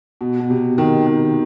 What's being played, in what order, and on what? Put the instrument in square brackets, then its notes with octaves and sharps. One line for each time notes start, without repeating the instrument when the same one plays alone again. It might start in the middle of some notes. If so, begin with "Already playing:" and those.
[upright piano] B2
B2
C3
D#3
D#3